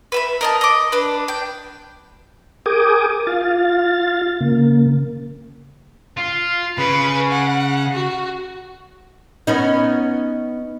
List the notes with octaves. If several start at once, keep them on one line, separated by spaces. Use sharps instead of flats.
B4 E5 B5
A#4 D#5 A5
D#5 D6
D4 B4
G5
G#4 A#4 G5 G#5 D6 D#6
F4 F5 A6
C#3 A#3
F4
C#3 B4
F#5
F#4
B3 C#4 D#4